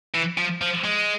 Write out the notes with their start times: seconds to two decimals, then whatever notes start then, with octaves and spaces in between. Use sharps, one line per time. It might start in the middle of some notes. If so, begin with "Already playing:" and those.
0.14 E3
0.38 F3
0.61 F3
0.84 G#3